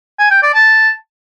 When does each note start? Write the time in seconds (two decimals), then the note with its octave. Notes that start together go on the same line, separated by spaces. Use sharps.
0.19 G#5
0.31 G5
0.43 D5
0.55 A5